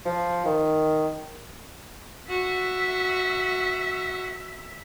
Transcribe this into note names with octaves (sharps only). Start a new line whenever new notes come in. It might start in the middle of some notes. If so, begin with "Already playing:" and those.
F3
D#3
F#4 E5